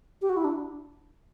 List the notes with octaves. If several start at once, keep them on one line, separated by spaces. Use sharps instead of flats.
G4
F#4
E4
D4